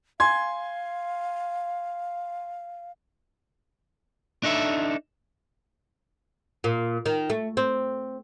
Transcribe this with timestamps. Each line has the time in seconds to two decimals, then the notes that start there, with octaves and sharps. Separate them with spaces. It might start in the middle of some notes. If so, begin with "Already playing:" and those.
0.20 F5 G#5 C6 G#6
4.43 D4 D#4 A4 E5
6.64 A#2
7.06 D#3
7.30 A3
7.57 C4